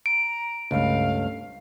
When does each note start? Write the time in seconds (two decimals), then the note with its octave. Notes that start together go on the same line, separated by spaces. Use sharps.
0.06 A#5 D7
0.71 C#2 G2 A3 F5